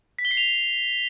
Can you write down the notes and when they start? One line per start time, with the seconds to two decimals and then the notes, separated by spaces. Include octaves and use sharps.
0.19 B6
0.25 G7
0.31 C7
0.37 F7